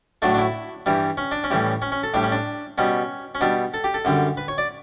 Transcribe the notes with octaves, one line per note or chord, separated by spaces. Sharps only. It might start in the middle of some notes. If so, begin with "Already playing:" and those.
A2 F#3 A3 D4
D4
E4
G2 E3 G3
C#4
D4
C#4
A2 E3 G3
C#4
C#4
A4
A2 G3 D4
C#4
D4
B2 G3 C#4
C#4
B2 G3 D4
A4
G4
A4
F#2 D3 G3
B4
C#5
D5